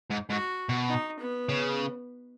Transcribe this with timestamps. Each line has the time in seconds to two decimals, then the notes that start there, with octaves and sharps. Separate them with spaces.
0.11 G#2
0.30 G#2 F#4
0.69 B2
0.89 D#4
1.19 B3
1.49 C#3